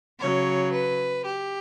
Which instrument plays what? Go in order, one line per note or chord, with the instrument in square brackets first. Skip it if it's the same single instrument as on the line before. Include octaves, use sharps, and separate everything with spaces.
[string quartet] C#3 F#3 C#5
B4
G4